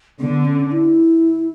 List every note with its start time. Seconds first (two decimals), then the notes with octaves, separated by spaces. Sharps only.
0.19 D3 B3
0.45 C#4
0.72 E4